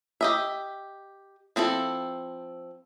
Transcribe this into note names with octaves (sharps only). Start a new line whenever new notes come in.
G4 D#5 E5
F3 C4 E4 A4